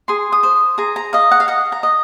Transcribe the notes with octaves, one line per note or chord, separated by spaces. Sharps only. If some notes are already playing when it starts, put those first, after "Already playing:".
G#4 C6
D#6
C5
G#4 A#5
A#5
D#5 F5
F#5
F5
D#5 F#5
A#5
D#5